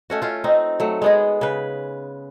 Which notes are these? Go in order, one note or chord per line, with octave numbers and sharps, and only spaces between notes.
A3 C#4 F#4
C#4 F4
C4 D#4
F#3 A3
G#3 B3 G#4
C#3 B4